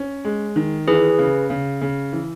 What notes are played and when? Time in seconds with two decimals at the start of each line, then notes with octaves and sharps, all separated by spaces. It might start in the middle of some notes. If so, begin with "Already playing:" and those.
Already playing: C#4
0.25 G#3
0.56 D#3
0.88 E3 G#4 B4
1.19 C#3
1.50 C#3
1.81 C#3
2.13 E3